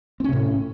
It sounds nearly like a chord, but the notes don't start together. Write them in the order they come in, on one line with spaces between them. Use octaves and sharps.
C4 C#4 C3 A2